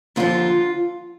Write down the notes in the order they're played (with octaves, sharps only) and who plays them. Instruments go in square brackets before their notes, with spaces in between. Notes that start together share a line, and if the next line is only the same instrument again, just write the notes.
[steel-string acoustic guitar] D#2 D3 F3 F4